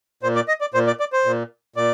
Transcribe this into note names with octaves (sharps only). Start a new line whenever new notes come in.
A#2 C5
D5
D#5
D5
A#2 C5
D5
D5
C5
A#2
A#2 D5